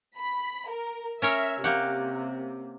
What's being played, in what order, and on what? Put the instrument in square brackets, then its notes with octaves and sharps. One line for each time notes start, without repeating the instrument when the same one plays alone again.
[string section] B5
A#4
[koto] C#4 A#4 C#5 [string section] E5
[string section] C3 [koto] A#3 G4 F#5